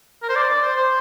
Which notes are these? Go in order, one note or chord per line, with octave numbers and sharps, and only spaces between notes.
A#4
C5
D5
D5
C5
C5